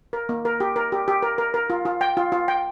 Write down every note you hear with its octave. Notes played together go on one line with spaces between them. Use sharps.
A#4
A#3
A#4
G4
A#4
G4
G4
A#4
A#4
A#4
F4
F4
G5
F4
F4
G5